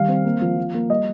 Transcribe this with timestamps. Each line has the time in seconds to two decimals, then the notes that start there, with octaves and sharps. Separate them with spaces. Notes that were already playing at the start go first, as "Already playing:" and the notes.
Already playing: D#3 G3 F5
0.08 C4
0.25 A#3
0.42 F3
0.57 F3
0.74 A#3
0.90 G3 D#5